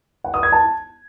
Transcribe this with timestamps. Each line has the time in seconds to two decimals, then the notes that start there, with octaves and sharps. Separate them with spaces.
0.24 F#5
0.34 D#6
0.43 G#6
0.52 A5